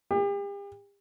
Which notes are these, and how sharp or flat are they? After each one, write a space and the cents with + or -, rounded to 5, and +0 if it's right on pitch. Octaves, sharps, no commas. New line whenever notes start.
G4 +40